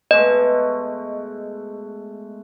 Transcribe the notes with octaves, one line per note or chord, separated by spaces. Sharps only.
B2 G#3 A3 D#5